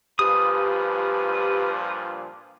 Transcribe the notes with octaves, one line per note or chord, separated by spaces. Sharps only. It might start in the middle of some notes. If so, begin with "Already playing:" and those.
G2 A#2 F3 G4 B4 D#6